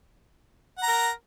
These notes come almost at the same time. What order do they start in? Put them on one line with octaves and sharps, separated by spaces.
F#5 A#5 A#4